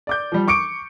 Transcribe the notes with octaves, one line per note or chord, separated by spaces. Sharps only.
D5 D6 G6
F3 G3
C#6 D6 C#7 D7